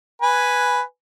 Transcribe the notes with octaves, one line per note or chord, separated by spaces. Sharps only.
B4 G#5